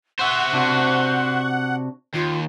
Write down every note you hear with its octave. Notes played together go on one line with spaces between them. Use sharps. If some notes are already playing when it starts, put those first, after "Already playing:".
C5 E5 F#5 C#6
C3 D4 F#4
D#2 F4